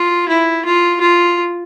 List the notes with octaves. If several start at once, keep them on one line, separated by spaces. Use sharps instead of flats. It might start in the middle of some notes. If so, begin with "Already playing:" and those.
Already playing: F4
E4
F4
F4